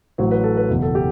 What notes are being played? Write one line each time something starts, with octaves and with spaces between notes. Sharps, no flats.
A1 A2 F#3 C5
B4
A4
B4
F#1 E2 B2
A4
G4